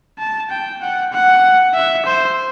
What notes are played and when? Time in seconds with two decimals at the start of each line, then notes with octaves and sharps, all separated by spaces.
0.19 A5
0.50 G5
0.82 F#5
1.13 F#5
1.74 E5
2.06 C5